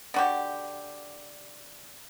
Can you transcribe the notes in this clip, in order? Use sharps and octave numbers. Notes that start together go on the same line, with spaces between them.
D3 F#4 G4